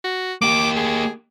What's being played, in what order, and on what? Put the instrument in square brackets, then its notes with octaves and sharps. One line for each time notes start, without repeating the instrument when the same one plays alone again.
[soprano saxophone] F#4
[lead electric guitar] A#3 G4 [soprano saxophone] D6
[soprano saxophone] G#4